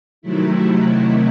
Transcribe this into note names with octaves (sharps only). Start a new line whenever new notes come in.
C3 D#3 F#3 A3 E4